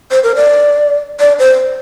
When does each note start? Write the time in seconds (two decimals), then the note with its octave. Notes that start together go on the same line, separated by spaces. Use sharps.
0.11 C5
0.24 A#4
0.36 D5
1.20 D5
1.39 C5